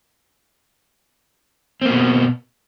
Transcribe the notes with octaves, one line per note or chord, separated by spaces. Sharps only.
B2 A#3 C4